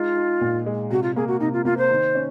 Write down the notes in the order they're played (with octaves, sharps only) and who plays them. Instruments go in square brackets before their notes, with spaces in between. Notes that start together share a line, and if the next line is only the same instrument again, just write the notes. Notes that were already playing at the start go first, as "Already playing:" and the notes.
Already playing: [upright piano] G#3 D#4 [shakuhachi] F4
[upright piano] D#4
A#2
G#3
[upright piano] C3 [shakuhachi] F#4
[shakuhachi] F4
[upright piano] A#3 [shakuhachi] G#4
[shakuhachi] F#4
[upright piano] C3 [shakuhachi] D#4
[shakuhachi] F4
[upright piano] A#3 [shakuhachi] F4
[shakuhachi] C5
[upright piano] D#3
C#4